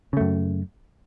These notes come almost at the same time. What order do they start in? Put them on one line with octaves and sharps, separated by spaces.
C#3 A3 F#2